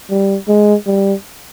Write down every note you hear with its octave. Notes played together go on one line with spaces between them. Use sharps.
G3
G#3
G3